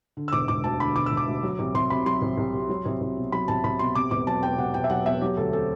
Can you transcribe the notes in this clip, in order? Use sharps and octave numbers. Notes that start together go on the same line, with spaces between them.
D3
E6
E1 D6
E1 D6
D2 A5
D3 B5
E1 D6
E6
E1
D6
D2
F#3
C2
C2 C6
C3 B5
F#3 C6
C2
C2
C3
F#3
C2
C2
B2
F#3 B5
C2 A5
C2 B5
B2 C6
C3 D6
E1 D6
F#3 A5
E2 G5
C3 F#5
E1 G5
E5
F#3 F#5
E2 E5
F#3 G4
D2 A4
C4 A4